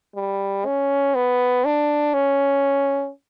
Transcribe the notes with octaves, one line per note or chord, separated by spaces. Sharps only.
G3
C#4
B3
D4
C#4